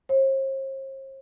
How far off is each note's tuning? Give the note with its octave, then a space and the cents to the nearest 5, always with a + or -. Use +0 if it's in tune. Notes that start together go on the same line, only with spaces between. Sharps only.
C5 +45